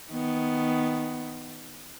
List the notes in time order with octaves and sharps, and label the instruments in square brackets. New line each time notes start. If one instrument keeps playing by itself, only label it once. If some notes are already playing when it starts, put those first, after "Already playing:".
[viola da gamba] D#3 B3